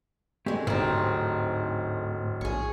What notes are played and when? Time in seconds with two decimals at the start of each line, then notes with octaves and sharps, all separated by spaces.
0.46 D#2 G#3 A3 C4 G4 G#4
0.67 D1 G#2 C4 D#4
2.41 A#1 G#4 C#5